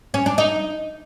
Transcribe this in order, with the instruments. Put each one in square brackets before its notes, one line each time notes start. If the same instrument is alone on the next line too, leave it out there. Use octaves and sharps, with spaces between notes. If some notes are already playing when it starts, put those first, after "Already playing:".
[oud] C#4
D4
D#4